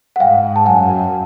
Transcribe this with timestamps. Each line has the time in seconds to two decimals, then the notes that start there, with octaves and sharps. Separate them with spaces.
0.16 F#5
0.20 G#2 F5 G5
0.56 A5
0.66 F#2 F#5 G#5